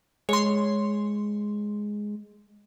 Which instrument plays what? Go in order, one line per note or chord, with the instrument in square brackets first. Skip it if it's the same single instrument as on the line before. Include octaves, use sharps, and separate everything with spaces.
[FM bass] G#3 [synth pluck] C#5 C6